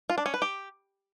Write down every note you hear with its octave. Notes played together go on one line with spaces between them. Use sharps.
F4
D4
C#4
B4
G4